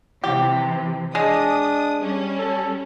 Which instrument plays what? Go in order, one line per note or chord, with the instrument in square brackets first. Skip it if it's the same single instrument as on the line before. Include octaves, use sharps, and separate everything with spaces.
[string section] C3 E3 [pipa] G4
[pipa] G#3 [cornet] D4 [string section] D#6
[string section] G3 C#4
[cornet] A4